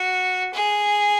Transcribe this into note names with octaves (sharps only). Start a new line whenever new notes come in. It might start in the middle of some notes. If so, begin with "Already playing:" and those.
Already playing: F#4
G#4